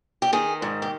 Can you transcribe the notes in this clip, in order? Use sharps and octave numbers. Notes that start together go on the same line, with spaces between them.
G4
D#3 G#4
G#2
G4